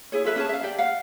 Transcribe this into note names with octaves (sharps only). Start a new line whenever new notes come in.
E4 G#4 C#5
F4 A4 B4 E5
C#4 G#4 C5 A5
E5 F5
G4 D5 G5
F5 F#5